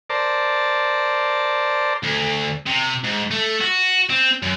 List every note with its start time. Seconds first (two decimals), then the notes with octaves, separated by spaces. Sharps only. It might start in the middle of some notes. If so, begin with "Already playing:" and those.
0.10 A#4 C5 D5 A5
2.03 D2
2.66 C3
3.04 G#2
3.31 A3
3.61 F#4
4.10 C4
4.42 F#2